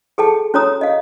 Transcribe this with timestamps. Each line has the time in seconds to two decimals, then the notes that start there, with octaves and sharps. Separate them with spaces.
0.18 G#4 A4 G5 A5
0.54 C#4 F#4 C#5 A#5 D#6
0.81 D#5 F5